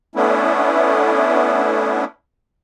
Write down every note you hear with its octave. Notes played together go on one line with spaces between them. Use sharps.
A3 B3 C#4 D4 E4